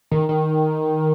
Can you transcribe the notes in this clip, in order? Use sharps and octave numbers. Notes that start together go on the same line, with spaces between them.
D#3
D#3